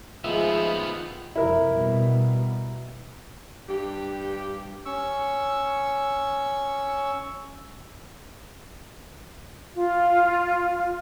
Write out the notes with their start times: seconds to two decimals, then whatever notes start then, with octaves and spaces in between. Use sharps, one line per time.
0.24 D#3 F3 G#3 B3 F4 B4 E5
1.36 F2 C3 E4 A#4
1.72 B2 G3
3.68 G2 G4
4.86 C#4 C#6 E6
9.75 F4